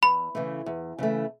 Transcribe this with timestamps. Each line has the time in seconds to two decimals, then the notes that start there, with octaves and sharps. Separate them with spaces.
0.03 E2 B5
0.35 C#3 E3 A3
0.66 E2
0.98 C#3 E3 A3